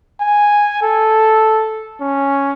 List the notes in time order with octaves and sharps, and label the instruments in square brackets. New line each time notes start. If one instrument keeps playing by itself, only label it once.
[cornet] G#5
A4
C#4